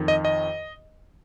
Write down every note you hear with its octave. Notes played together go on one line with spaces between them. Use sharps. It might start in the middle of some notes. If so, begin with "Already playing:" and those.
Already playing: F2 D#3
D#5
D#5